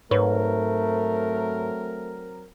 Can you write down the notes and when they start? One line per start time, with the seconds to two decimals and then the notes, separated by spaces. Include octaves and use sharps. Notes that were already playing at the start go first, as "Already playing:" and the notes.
0.11 G#2 F#3 A3 C4 A#4 B4 C#5